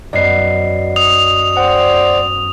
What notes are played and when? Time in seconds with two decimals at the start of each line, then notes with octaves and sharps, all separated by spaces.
0.13 F#2 B3 D5 D#5 C7
0.96 D#6 F7
1.57 C5 D5 F#5 G5